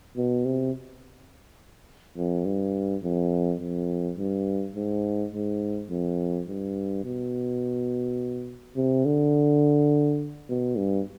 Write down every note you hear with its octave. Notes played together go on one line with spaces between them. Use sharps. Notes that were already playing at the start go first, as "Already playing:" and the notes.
B2
C3
F2
G2
F2
F2
G2
G#2
G#2
F2
G2
B2
C3
D3
B2
G2